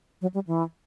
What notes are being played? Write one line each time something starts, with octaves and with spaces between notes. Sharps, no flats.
F#3
G3
E3